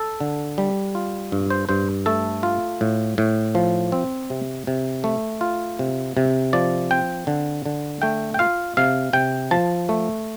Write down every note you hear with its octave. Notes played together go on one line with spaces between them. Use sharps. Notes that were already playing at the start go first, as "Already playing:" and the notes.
Already playing: A4
D3
G3
F4
G2
C5
G2 C5
A3 A4
F4
A2
A2
F3
C4
C3
C3
A3
F4
C3
C3
F3 D5
C4 G5
D3
D3
A3 G5
G5
F4 F5
C3 F5
C3 G5
F3 A5
A3